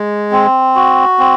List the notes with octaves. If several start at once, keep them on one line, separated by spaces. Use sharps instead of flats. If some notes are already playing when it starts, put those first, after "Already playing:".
Already playing: G#3
C4
F#4
C4